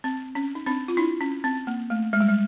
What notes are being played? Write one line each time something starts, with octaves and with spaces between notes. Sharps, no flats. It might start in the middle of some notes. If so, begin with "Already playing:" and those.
C4
C#4
D#4
C4 D4
F4
D4 E4
C#4
C4
A#3
A3
G#3
G3
G#3